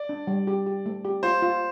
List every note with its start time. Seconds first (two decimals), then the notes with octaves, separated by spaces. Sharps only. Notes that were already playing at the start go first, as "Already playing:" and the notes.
Already playing: D5
0.09 D4
0.27 G3
0.47 G4
0.66 G4
0.86 A3
1.05 G4
1.23 F4 C5
1.42 F4